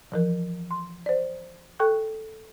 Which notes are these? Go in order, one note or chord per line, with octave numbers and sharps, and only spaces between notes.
E3 F3 A#4
C6
C5 D5
A4 G5 C#6 F#6